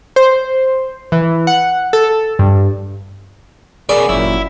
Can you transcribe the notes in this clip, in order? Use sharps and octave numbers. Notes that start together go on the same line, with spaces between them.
C5
E3
F#5
A4
G2
B2 C#4 G#4 A#4 D5
G1 F#2 A#2 E4 C#5